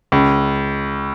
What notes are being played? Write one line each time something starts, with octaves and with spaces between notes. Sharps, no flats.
C#2